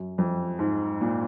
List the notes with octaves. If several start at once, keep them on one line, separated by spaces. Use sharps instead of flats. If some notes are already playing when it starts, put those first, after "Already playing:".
Already playing: F#2
F2
G#2
A#2